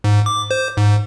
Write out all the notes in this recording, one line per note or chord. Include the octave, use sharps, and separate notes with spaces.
G#2
D6
C5
G#2